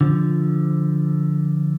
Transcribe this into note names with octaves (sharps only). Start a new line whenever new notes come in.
D3 F3